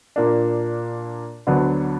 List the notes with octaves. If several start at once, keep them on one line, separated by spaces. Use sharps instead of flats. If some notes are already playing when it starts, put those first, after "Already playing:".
A#2 A#3 D4
D2 D3 F#3 B3 D4